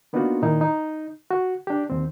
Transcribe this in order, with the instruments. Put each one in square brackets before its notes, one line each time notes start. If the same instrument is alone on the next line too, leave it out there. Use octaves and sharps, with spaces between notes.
[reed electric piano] A#3 B3 D4 D#4 F4 F#4
A#2 D#3 D#4 E4
D#4
F#4
D4 G4
D#2 C4